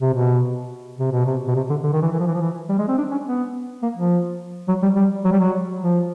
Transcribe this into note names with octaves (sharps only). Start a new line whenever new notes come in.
C3
B2
C3
B2
C3
B2
C3
D3
D3
D#3
E3
E3
F3
E3
F3
E3
G3
G#3
C4
D4
C#4
B3
A#3
F3
F#3
G3
G3
F#3
G3
F#3
F3